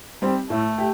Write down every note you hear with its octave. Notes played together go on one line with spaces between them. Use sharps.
G3 C4 G4
A2 A3
G4